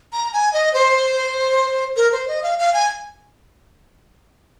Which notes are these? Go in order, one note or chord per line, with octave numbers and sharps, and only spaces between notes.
A#5
G#5
D#5
C5
A#4
C5
D#5
F5
F5
G#5